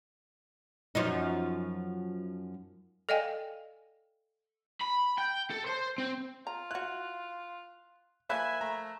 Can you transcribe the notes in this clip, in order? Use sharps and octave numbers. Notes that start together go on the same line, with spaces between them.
F#2 F3 D#4
A4 D5 D#5 F5 G5 G#5
B5
G5
A4
C5
C4
F4 A#5
E4 F#4 F#6
F3 A#3 E5 G#5 B5 F#6
A3 A#5